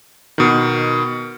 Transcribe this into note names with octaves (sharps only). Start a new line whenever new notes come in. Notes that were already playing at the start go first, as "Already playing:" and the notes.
B2 D#3